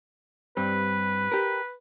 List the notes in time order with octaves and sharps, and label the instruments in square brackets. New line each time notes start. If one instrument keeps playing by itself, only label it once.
[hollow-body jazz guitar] G2 G3 C4 [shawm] B4
[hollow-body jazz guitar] G4 A#4